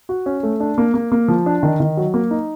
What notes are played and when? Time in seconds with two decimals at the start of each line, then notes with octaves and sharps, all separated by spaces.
0.09 F#4
0.26 C#4
0.43 A3
0.60 D4
0.78 A#3
0.94 A#3
1.12 A#3
1.28 F3
1.46 D4
1.63 D#3
1.80 D#3
1.97 F#3
2.14 A#3
2.31 D#4